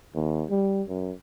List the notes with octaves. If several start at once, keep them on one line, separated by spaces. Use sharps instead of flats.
D#2
G3
F#2